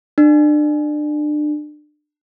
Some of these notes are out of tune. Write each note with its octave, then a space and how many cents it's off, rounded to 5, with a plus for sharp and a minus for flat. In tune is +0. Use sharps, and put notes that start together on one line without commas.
D4 +30